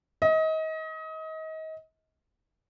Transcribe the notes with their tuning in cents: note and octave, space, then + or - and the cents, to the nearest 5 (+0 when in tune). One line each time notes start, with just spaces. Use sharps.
D#5 +30